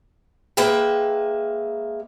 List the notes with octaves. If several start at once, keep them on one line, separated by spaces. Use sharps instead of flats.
G#3 A#3 B4 E5 G5